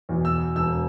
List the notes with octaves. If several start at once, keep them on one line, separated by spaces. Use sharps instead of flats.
E2 B2
E6
E1 E6